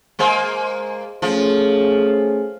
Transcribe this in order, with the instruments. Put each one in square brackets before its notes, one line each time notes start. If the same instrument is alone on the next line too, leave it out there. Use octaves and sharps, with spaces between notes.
[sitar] G#3 A#3 C5
[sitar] F3 [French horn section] A3 C#4 G#4